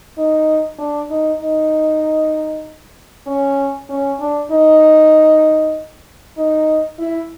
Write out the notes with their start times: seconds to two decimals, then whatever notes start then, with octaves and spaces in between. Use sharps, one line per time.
0.18 D#4
0.78 D4
1.10 D#4
1.41 D#4
3.26 C#4
3.89 C#4
4.20 D4
4.51 D#4
6.37 D#4
6.99 E4